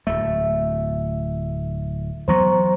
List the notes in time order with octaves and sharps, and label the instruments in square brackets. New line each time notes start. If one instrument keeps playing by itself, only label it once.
[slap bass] D1 A3 [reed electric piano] E5
[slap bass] E3 F#3 B3 [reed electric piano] C5 A#5 C#6